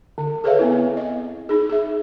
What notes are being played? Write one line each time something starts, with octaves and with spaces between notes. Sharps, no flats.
D3
G#4 A4 B4 C#5 E5 F5
B3 C4 E4
D#5
D#4 G#4
G#4 E5